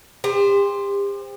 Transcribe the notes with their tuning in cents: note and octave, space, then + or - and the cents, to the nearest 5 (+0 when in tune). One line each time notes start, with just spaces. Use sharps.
G4 +40 C5 +0